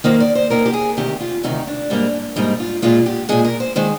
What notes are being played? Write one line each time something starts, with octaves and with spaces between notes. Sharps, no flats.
D#2 D#3 A#3 C5
D5
C5
D#2 D#3 A#3 A#4
G4
G#4
D2 C3 D#3 G4
F4
D2 C3 D#3 D#4
D4
G#2 G3 A#3
G#2 G3 A#3 D#4
F4
A#2 G#3 F4
G4
A#2 G#3 G#4
A#4
C5
D#3 G#3 C5